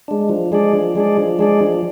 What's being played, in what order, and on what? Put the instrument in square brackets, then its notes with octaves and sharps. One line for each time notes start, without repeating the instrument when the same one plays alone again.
[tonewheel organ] G#3 D4
F3
G#3 D4 G#4 D5
F3
G#3 D4 G#4 D5
F3
G#3 D4 G#4 D5
F3